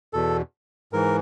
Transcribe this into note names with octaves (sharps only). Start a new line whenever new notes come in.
E2 B2 A4
G#2 E3 A#4